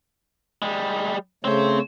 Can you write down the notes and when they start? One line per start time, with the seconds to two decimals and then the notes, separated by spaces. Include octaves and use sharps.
0.62 G3 G#3
1.44 C#3 A3 C4 C5 C#5